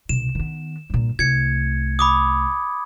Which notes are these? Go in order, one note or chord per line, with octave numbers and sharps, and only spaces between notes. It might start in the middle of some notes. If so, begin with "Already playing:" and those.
C2 B2 E7
D#3 B3
G2 A#2
C2 A3 G#6 C#7
B5 D6 D#6